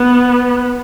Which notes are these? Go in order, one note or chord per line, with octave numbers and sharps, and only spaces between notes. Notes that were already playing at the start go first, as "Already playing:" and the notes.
Already playing: B3